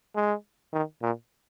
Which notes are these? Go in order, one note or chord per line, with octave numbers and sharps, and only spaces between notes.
G#3
D#3
A#2